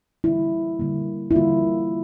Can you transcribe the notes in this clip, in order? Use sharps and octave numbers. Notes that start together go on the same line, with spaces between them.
D3 G3 A#3 E4
D3 G3 A#3
E4
D3 G3 A#3 F4